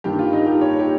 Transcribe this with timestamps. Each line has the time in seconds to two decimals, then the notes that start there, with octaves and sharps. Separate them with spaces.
0.04 G2 D#3 A#3 G4
0.19 F4
0.33 D#4
0.47 G4
0.61 C#5
0.79 G4